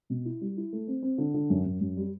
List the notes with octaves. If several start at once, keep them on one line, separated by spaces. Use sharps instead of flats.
B2
E4
G3
E4
A3
C4
C4
D3
D3
F#2
F#2
F#2
G3